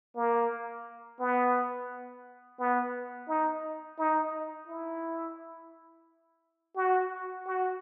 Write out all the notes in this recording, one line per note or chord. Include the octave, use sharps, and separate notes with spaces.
A#3
B3
B3
D#4
D#4
E4
F#4
F#4